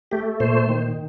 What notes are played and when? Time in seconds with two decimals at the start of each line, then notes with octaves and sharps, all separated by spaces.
0.11 A3 G4
0.40 A#2 C5
0.69 D#3